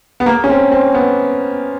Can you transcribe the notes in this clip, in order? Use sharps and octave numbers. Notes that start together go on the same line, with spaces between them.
B3
A#3
C#4
C4
C4
B3